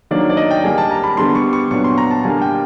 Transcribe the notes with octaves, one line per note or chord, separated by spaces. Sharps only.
D#3 F#3 A#3 D4 D5
D5
D#5
G5
D3 G3 A#3 D4 G#5
A5
A#5
B5
D3 G3 B3 D4 C6
C#6
C#6
A#2 F#3 B3 D4 C#6
C6
A#5
A5
D3 G3 A#3 D4 G#5
G5